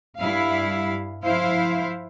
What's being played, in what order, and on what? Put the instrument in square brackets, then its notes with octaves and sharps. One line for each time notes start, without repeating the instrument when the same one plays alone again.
[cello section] G2 G3 E4 F5
F3 E4 C5 F5